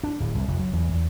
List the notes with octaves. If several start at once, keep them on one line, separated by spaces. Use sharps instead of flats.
D4
D1
C2
F1
F#3
E2
E2